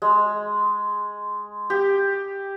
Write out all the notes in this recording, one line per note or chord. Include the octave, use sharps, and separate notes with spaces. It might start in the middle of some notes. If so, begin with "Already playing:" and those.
G#3
G4